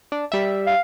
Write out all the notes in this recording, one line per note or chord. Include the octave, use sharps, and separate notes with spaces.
D4
G3 E5
F5